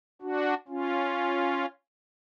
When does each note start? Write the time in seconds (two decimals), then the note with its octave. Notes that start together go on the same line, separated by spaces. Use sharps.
0.22 D4 F#4
0.68 C#4 F4